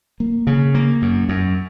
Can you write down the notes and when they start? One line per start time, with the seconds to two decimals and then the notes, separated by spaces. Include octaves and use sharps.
0.20 A#3
0.47 C#3
0.75 A#3
1.02 F#2
1.29 F#2